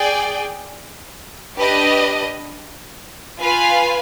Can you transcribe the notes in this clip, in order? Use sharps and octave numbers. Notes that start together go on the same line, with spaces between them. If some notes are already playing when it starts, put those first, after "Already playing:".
Already playing: G#4 D5 G5
D4 G4 B4 D#5
F4 B4 F5 G#5